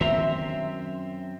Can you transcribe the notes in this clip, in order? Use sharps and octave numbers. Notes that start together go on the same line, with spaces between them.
F#2 D#3 B3 C4 E5 A#5 C6